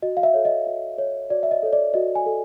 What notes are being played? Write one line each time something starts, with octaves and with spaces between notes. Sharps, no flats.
F#4 D#5
F5
E5
A4 C#5
D#5
F#4
A4 C#5
F#4 D5
E5
D#5
A4 C#5
D5
F#4 D#5
G#5
A4